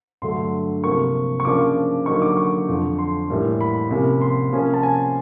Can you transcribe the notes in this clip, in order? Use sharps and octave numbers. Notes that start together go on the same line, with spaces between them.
G2 D3 F#3 A3 C6
C3 F3 A#3 C#6
C#6
C#3 F3 A#3 D4 D6
D3 F#3 A#3 D#4 C#6
D6
C#6
F2 D3 F3
C6
A2 E3 G3 A#3
B5
C3 F3 A#3 C#4
C6
C3 F3 A#3 C#4
A5
G#5